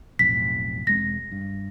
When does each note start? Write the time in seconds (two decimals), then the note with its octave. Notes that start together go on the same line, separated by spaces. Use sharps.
0.19 B1 F2 A2 B6
0.87 E1 G#3 C4 A#6
1.32 G2